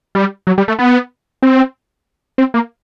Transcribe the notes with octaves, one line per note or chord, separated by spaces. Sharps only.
G3
F#3
G3
A3
B3
C4
C4
A#3